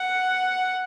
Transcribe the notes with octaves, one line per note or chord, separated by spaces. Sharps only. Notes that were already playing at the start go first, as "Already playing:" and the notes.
Already playing: F#5